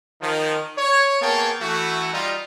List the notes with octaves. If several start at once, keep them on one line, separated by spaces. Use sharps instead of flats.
D#3 F3
C#5
A#3 B3 G#4 C#5 G5 A5
E3 A3 F#4
G3 D#4 F4